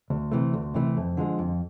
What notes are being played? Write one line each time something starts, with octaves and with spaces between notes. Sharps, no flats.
D2
C3 E3 A3
D2
C3 E3 A3
F2
D3 F3 G#3
F2